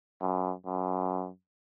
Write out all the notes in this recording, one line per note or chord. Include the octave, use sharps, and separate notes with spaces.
F#2
F#2